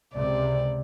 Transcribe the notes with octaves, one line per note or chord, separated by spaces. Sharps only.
C#2 C3 D5